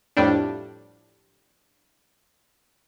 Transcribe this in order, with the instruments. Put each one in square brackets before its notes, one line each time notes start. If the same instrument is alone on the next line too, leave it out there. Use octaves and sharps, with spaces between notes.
[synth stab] F2 A2 G3 D4